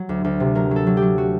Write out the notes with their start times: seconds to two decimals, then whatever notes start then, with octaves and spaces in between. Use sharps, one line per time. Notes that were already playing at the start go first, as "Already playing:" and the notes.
Already playing: F#3
0.09 D2
0.24 D2
0.40 C3
0.55 F#3 A#4
0.71 F#3 A4
0.87 F#3
0.97 G4
1.02 F#3
1.18 F#4